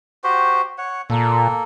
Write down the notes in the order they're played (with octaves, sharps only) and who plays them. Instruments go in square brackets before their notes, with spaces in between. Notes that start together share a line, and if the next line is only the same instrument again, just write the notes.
[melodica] F#4 G4 C5
C#5 F#5
[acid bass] A#2 [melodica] A#3 A4